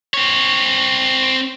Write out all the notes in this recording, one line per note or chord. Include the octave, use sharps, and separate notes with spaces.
C4 C#5